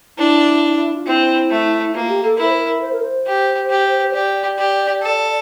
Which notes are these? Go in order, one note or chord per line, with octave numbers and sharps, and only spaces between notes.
D4 E4
F4
C4 E4
A3
A#3 F4
G4
A4
E4 A#4
C5
A#4
C5
A#4
C5
G4
G4
C5
G4 D5
G4
A4